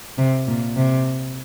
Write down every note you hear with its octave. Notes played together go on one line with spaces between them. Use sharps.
C3
A#2
C3